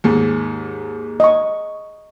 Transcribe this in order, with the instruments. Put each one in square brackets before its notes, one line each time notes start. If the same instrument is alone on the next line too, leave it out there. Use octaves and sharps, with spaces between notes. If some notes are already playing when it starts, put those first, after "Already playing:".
[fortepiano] D#2 G#2
[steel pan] D#5 C#6